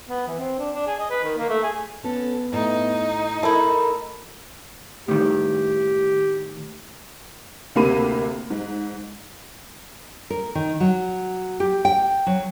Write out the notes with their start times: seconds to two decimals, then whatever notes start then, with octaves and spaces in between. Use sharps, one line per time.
0.09 B3
0.28 E3
0.39 C4
0.59 D4
0.75 D4
0.87 G#4
0.99 D#5
1.10 B4
1.24 D#3
1.38 A#3
1.50 A3
1.63 G#4
2.03 B3 C#4 A4
2.53 A2 D#4
3.43 A3 E4 A4 A#4
5.08 A2 D#3 G4
7.75 D2 C3 A#3 B5 D#7
8.50 G#2
10.30 A#4
10.55 D#3
10.80 F#3
11.60 G4
11.85 G5
12.27 F#3